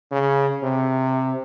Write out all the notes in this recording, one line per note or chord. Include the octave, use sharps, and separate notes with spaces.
C#3
C3